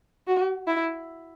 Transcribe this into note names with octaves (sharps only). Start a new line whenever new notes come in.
F#4
E4